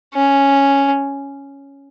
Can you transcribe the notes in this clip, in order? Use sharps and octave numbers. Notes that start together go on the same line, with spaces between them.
C#4